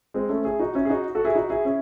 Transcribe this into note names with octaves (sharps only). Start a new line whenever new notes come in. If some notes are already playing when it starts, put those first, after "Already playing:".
G#3 C4
A3 C#4
E4 G#4
D#4 F#4
C#4 E4
G#4
D#4 F#4
F#4 A4
E4 G#4
D#4 F#4
E4 G#4
C#4 E4